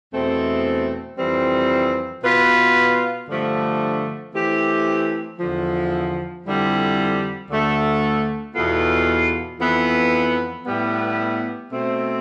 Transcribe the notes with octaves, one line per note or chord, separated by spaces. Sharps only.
E2 B2 A3 C4
F2 E3 G3 C4
B2 B3 F4 B4
G2 D3 F3 A3
E3 A3 C4 G4
E2 D3 F3
F2 D3 G3 C4 E4
D2 D3 A3
E2 B2 B3 F4 A4
F2 E3 B3
A2 G3 B3
B2 A3 C4